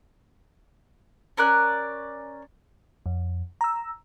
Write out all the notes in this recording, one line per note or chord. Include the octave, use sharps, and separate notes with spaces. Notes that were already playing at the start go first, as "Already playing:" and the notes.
C#4 A#4 D5 F#6
F2
A#5 E6